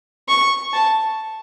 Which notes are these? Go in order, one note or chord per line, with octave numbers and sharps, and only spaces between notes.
C#6
A5